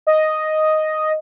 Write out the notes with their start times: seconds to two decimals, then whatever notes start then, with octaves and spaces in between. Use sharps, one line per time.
0.07 D#5